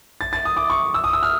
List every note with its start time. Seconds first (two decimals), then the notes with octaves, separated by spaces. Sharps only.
0.21 A6
0.33 A6
0.45 D#6
0.57 D6
0.70 C#6
0.94 E6
1.04 D#6
1.13 E6
1.23 F6